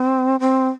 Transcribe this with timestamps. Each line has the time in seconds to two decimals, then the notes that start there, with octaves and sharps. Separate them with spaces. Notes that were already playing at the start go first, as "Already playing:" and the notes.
Already playing: C4
0.40 C4